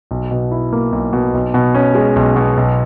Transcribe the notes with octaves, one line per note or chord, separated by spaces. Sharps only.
B1
B2
E4
A#3
B1
B2
B1
B2
C#4
G#3
B1
B2
B1